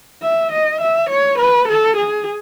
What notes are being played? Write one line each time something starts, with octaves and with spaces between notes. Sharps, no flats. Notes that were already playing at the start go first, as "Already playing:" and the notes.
E5
D#5
E5
C#5
B4
A4
G#4